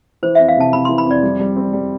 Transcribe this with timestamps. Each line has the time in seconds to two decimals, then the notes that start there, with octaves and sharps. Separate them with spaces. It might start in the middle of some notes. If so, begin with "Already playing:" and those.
0.23 E3 C5
0.35 F2 E5
0.48 F5
0.57 C3 A5
0.73 C3 B5
0.85 E3 C6
0.98 B5
1.06 F2 D5
1.23 G3
1.40 G3
1.57 C4
1.73 G3